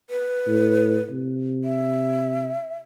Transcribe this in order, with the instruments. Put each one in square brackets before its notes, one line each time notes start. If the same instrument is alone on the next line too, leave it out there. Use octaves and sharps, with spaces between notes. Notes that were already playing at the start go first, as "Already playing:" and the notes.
[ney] B4
[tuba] A2
C3
[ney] E5